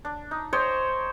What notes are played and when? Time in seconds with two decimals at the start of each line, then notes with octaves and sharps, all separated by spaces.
0.05 D4
0.31 D#4
0.53 C5 C#5 D#5 G5